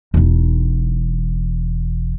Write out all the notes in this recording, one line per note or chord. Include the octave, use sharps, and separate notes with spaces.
E1 D#4